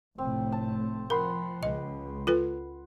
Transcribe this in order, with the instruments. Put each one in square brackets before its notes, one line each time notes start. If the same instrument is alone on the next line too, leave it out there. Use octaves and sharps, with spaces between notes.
[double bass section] F1 A2 A3 [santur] C4
[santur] A5
[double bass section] F3 [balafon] A#4 [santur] F#5 B5 C6
[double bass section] C#2 [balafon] D#5
[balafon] F4 A4 B4